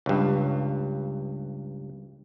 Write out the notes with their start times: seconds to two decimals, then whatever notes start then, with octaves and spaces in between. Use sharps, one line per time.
0.06 C#2 G2